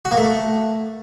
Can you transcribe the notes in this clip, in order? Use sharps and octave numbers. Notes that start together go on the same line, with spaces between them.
F#4
A#3
A3